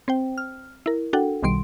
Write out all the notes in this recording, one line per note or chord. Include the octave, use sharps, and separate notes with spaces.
C4 C5 G5
F6
E4 A#4
D4 F#4 A4 F#5 G5
B1 B2 D#3 G3 C6 D7